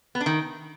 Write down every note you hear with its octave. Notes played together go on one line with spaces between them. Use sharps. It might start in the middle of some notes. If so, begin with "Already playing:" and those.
B3
D4
D#3